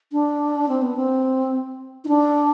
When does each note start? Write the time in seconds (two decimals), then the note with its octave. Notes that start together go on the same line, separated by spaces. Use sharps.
0.12 D4
0.69 C4
0.82 B3
0.97 C4
2.04 D#4
2.08 D4